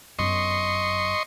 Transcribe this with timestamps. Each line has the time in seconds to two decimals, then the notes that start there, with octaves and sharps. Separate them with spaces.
0.19 G1 F#2 D#5 C6 C#6